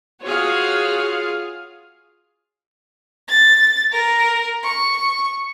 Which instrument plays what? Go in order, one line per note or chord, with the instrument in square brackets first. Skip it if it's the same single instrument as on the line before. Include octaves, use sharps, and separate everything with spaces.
[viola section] F4 G#4 F5 [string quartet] F#4 C#5
[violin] A6
A#4
C#6